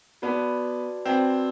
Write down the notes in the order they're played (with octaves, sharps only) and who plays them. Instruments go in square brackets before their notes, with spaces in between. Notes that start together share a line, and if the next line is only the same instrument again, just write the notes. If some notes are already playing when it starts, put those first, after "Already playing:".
[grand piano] B3 [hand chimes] F#4 B4 D5 F#5 A5
[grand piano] C4 [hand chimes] F#4 B4 D5 F#5 A5